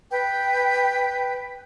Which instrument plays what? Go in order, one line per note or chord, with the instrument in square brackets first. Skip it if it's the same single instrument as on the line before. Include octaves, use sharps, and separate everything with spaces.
[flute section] B4 G5